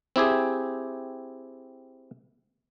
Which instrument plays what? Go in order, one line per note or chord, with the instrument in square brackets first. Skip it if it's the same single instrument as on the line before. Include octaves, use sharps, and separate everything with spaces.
[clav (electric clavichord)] C4 E4 G4 G#4